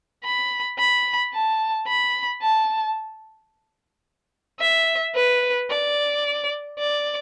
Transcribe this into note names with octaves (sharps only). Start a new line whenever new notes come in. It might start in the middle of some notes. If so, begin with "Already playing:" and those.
B5
B5
A5
B5
A5
E5
B4
D5
D5